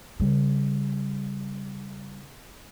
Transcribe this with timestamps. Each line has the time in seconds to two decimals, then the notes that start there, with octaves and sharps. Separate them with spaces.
0.20 C#3 G3